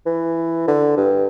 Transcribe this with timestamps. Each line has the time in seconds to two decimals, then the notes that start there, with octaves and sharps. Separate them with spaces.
0.06 E3
0.68 D3
0.97 G2